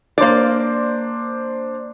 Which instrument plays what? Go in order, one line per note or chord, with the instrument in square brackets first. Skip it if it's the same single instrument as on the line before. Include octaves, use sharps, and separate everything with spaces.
[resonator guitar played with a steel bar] A#3 D5 [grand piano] D4 C5